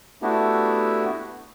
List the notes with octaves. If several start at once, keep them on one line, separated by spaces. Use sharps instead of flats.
A3 B3 D4 E4 F#4 G4